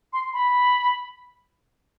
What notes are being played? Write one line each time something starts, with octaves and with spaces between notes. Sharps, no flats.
C6
B5